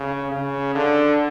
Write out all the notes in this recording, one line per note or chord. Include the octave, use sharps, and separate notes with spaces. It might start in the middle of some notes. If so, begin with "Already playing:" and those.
Already playing: C#3
C#3
D3